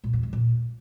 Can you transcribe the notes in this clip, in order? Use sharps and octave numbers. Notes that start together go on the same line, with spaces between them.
A#2
E2
G#3
A#2